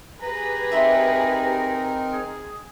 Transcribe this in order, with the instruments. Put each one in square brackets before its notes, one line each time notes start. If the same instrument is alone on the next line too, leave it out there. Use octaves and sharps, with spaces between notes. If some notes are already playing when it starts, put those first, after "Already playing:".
[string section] G4 G#4 B4 [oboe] A#5
[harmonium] C4 D#4 A#4 [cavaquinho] E5 B5 C6
[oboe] G#4